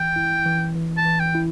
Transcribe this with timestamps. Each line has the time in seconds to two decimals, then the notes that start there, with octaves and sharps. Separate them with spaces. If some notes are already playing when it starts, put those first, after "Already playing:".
Already playing: E3 G5
0.16 E4
0.46 E3
0.76 E3
0.97 A5
1.05 E3
1.20 G5
1.35 E4